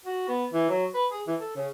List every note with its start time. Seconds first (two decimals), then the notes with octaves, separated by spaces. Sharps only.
0.05 F#4
0.28 B3
0.53 E3
0.69 F#3
0.94 B4
1.11 G#4
1.27 E3
1.40 A4
1.56 C#3